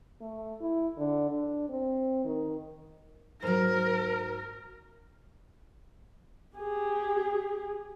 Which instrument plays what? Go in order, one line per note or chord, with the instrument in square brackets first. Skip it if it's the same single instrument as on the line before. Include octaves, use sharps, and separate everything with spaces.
[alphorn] A3
E4
D3
D4
C4
D#3
[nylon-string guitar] G#2 F#3 [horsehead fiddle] A#4
[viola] G4 G#4